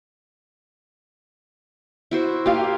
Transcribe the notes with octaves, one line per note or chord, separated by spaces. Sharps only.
E4 F#4 C5
A#3 F4 G4 F5